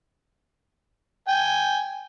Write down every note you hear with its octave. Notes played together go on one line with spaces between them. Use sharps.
G5 G#5